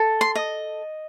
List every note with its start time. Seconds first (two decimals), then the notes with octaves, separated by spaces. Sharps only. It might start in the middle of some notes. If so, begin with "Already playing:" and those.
Already playing: A4
0.21 C6
0.36 D#5